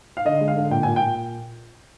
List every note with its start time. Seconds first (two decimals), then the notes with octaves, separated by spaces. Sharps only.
0.17 F5
0.25 D3 D#5
0.40 G#3
0.48 F5
0.56 D3
0.70 A#2 G5
0.83 A#2 G#5
0.96 A#2 G5